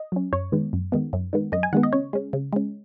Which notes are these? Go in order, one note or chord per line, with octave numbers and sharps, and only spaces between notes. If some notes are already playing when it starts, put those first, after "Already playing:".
Already playing: D#5
F#3 C#4
F#2 C#5
D#3 G#3 B3
F#2
D#3 G#3 B3
F#2
D#3 G#3 B3
F#2 D#5
G#5
D#3 G#3 B3 F#5
D#5
C#3 C#5
G#3 C#4
C#3
G#3 C#4